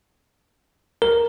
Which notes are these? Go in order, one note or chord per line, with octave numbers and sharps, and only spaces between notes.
A#4